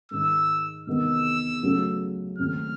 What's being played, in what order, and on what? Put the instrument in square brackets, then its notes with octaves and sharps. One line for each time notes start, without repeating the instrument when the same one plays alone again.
[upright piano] G#2 D#3 G#3 [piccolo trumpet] E6
[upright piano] E2 C3 D#3 G#3 B3 [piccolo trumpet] E6
[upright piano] C#2 C#3 F#3 A3
[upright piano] D#2 C#3 F3 A3 C4 [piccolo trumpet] F6